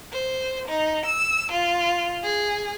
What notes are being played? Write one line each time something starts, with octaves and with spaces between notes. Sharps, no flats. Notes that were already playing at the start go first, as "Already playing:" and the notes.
C5
D#4
E6
F4
G#4